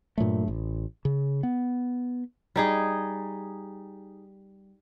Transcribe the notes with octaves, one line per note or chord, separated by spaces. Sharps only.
G2 A#2 F#3 A3
A1
C#3
B3
G3 D#4 G#4